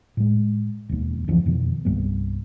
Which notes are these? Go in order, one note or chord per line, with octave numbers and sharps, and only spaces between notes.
A2 G#3
E1 D#2
C#2 F#2 E3 F3
F2 B2 D#3
C2 G2 A#3 B3